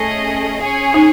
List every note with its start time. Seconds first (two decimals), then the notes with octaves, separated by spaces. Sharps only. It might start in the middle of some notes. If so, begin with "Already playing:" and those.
Already playing: A3 C#4 G#4 D#5
0.60 C#4 G#4 C#5 G#5
0.94 D#4